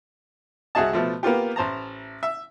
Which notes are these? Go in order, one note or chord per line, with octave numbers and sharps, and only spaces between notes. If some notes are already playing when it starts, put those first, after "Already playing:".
C2 F#4 G#4 D#5 A5
B2 F3 A3
A#3 B3 F4 G4
A1 C5 A5 A#5
E5